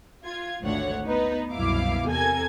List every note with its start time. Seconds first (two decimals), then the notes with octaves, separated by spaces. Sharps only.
0.24 F4 G#6
0.61 G#1 D2 C#5 F#5
1.06 B3 D#4 B4
1.53 C2 F#2 B2 E4 F5 D6
2.07 E2 C3 A4 A#4 G#5 G#6